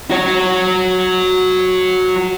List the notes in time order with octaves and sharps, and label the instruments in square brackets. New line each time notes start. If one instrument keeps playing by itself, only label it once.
[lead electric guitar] F#4 C#5